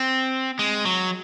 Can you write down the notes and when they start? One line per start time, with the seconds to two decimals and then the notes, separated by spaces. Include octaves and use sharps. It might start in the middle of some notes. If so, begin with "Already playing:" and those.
Already playing: C4
0.59 G#3
0.85 F#3